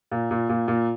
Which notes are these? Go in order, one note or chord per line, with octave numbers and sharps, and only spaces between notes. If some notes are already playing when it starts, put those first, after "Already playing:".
A#2
A#2
A#2
A#2